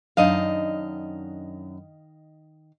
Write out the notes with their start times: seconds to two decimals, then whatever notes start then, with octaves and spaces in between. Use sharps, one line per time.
0.17 F#2 D#3 D4 D#4 D#5 F5